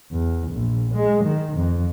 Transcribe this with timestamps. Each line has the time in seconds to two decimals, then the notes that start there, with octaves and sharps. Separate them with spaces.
0.12 E2
0.52 A#1
0.95 G#3
1.24 D#3
1.57 F2